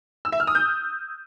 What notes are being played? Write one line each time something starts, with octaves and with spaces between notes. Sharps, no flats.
E6
E5
F6
D#6
G6